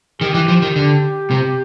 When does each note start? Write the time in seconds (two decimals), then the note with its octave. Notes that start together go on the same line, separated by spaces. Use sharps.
0.21 D#3 G4
0.34 E3
0.48 F3
0.62 D#3
0.76 D3
1.31 C3